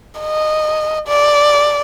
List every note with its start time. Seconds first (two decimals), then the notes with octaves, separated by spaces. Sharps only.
0.21 D#5
1.08 D5